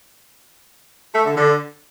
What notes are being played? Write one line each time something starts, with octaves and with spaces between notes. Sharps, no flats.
A3
D3
D3